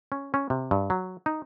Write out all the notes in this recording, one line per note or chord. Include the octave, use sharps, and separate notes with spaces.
C#4
C#4
C3
G2
F#3
D#4